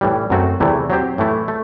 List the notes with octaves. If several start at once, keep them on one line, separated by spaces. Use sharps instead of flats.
A2 E3 G3
F#2 F#3 A3 C4 F#4
E2 C3 E3 A3 E4
F#3 C4 G4 C5
A2 E3 A3 E4
A3